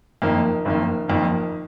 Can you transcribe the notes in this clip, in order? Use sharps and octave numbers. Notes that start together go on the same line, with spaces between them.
F#1 F2 D#3 A#3
F#1 F2 D#3 A#3
F#1 F2 D#3 A#3